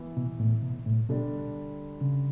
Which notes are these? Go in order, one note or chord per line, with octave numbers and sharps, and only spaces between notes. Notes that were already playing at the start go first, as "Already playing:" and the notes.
Already playing: E3 B3 E4
B2
A2
B2
A2
B2 D3 G3 D4
C#3